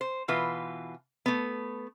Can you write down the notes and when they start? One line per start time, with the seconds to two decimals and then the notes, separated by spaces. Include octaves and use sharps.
0.01 C5
0.28 B2 E3 F4 B4
1.26 A3 B3